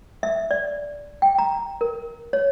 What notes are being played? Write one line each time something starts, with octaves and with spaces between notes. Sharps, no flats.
E5
D5
G5
A#5
A#4
C#5